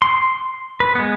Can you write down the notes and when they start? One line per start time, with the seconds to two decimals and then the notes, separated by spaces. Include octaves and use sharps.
0.02 C6
0.80 B4
0.95 G#3 B3